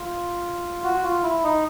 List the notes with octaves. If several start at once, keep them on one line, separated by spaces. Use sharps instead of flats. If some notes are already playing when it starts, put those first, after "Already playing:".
Already playing: F4
F#4
F4
E4
D#4